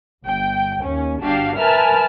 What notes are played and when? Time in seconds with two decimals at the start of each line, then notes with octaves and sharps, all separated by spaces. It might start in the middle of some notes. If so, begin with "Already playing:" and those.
0.23 G1 G5
0.82 D#2 C#4
1.21 G1 D4 F#4 G4 F5
1.55 A#4 B4 E5 G#5 A5 F6